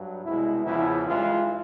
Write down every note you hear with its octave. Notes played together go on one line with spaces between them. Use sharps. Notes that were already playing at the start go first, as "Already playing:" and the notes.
Already playing: G2 F#3
C2 B2 G#3 E4
E2 C#3 F3 E4
G2 E3 G#3 F4